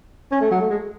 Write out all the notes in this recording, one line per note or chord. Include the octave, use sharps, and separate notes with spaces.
C#4
A3
F#3
A3
G#3